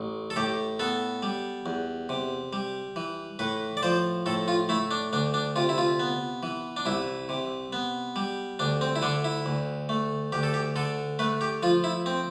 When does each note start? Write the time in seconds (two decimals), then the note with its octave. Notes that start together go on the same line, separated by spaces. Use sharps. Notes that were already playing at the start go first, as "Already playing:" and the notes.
Already playing: A1
0.30 A4
0.36 A2 G4
0.79 B3 A4
1.23 G3
1.66 E2
2.09 C3
2.53 G3
2.96 E3
3.39 A2 B4
3.77 D5
3.83 F3 C5
4.26 A2 A4
4.48 F4
4.69 A3 E4
4.91 D4
5.13 D2 D4
5.34 D4
5.56 C3 F4
5.69 E4
5.78 F4
6.00 B3
6.43 E3
6.77 D4
6.86 C2 E4
7.29 C3
7.73 B3
8.16 G3
8.59 D2 D4
8.81 C4
8.96 E4
9.02 D3 D4
9.24 E4
9.46 D2
9.89 A3
10.32 D2 G4
10.43 A4
10.54 G4
10.76 D3 A4
11.19 A3 B4
11.41 G4
11.63 F3 F4
11.84 E4
12.06 C4